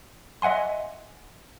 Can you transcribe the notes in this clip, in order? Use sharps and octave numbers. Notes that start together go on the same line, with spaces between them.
D#5 E5 F#5 G#5 C6